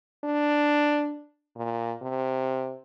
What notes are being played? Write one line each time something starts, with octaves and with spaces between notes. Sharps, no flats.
D4
A#2
C3